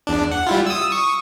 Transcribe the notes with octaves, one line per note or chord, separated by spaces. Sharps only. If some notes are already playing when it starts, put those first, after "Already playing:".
E2 D4
F#5
G3 E4 F4
D#6 E6
C#6 D#6